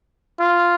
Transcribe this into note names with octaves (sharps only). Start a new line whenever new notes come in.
F4